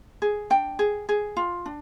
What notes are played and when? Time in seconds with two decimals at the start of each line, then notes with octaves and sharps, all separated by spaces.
0.22 G#4
0.50 D4 G5
0.79 G#4
1.09 G#4
1.37 F4
1.66 D4